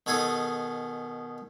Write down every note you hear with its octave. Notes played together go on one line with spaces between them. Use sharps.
B2 D#3 G#4 A4 G#5 D#6